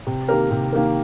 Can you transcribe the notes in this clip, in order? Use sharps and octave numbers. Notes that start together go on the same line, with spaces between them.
C3
D#3 A#3 G4 A#4
C3
D#3 A#3 G4 A#4